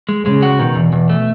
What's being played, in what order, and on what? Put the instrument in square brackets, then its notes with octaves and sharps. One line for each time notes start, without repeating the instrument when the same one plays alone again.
[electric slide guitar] G#3
[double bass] C#3 [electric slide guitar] G#3
[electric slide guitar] F#4
[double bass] B2 [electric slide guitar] D#3
[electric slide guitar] E2
E2
A3